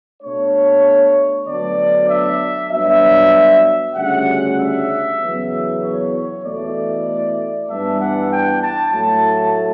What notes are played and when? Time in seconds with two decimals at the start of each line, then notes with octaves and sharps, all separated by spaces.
0.22 B2 A3 D4 C#5
1.46 D2 D3 F#3 B3 D4 D5
2.08 E5
2.70 G2 F#3 B3 D4 E5
3.95 D2 C#3 G3 C#4 F#5
4.57 E5
5.19 E2 C#3 F#3 B3
5.81 C#5
6.12 C#5
6.43 E2 B2 A3 E4 D5
7.67 G2 E3 G3 B3 D4 E5
7.98 F#5
8.30 G5
8.60 A5
8.92 A2 F#3 A3 E4 A5